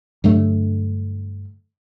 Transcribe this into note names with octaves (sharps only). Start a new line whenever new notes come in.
G2 D3 F#3 A3